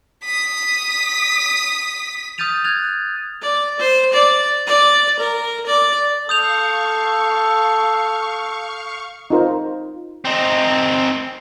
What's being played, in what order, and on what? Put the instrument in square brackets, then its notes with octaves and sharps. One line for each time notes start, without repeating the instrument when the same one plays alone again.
[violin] D#6 B6
[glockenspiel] D#6 F6 G6 A6 D#7 F7
F#6 G#6 A6 F7
[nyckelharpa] D5
C5
D5
D5
A#4
D5
[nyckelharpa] A4 [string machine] F5 C#6 [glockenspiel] D#6 G6 F7
[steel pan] D#4 F4 A#4 C5
[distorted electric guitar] C4 D#4